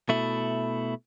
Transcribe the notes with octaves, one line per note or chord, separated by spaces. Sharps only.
B2 A3 E4